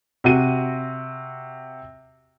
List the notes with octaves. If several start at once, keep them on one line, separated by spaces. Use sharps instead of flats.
C3 F#4 D#7